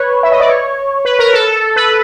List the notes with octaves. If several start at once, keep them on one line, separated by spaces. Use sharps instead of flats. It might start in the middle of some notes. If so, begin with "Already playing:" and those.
Already playing: B4 C#5
E5
D#5
D5
C#5
B4
A#4
A4
B4